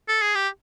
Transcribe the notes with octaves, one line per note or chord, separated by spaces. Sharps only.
A4
G#4
G4